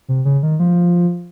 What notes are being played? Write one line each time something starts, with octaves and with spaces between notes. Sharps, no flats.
C3
C#3
D#3
F3